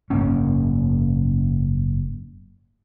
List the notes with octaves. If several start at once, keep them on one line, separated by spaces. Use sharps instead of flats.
F#1 G#2 A#3 C#4